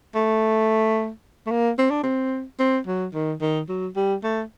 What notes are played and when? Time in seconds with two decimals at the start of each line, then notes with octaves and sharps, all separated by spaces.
0.15 A3
1.46 A3
1.51 A#3
1.78 C4
1.90 D4
2.03 C4
2.59 C4
2.87 F#3
3.14 D#3
3.41 D#3
3.69 F#3
3.96 G3
4.23 A3